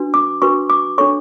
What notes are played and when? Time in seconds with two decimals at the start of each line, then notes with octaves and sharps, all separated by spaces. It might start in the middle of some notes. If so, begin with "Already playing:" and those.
Already playing: D4 F#4 B4
0.14 D6
0.42 D4 F#4 B4 C#6
0.70 D6
0.98 D4 A4 C#5 C#6